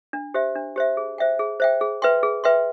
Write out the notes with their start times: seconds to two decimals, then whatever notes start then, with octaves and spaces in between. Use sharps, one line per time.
0.13 D4
0.34 G4 C5 E5
0.55 D4
0.76 G4 C5 E5
0.97 G#4
1.18 C5 E5 G5
1.39 G#4
1.60 C5 E5 G5
1.81 G#4
2.02 B4 E5 G5 C6
2.23 G#4
2.44 B4 E5 G5 C6